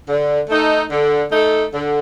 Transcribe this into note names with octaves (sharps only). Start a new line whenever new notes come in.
D3
A3 D#4 A4
D3
A3 D#4 A4
D3